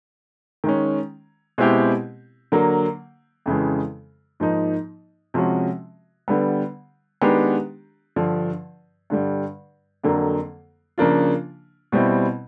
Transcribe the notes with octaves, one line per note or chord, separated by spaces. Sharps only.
D#3 G#3 C#4
B2 G#3 C4 E4 G4
D3 F#3 A#3
F2 C#3 E3 G#3
G#2 F3 A#3 D#4
C3 F3 G#3 C#4 F#4
D3 G3 B3
D#3 G#3 B3 D4 G4
G2 D3 F3
G2 D3 G3
F2 D3 F#3 A#3
C#3 F3 A#3 D4 F4
B2 G3 C4 E4